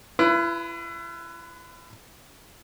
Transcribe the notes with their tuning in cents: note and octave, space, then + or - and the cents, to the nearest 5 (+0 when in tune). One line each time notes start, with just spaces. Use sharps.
E4 +40 B4 +0